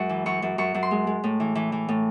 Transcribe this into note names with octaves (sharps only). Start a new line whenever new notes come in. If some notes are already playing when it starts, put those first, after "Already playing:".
Already playing: F#2 G#3 C#6
E3
F#2 C#6
F#2
F#2 C#6
F#2
C6
G#3
G#3
A2
E3
E3
E3
A2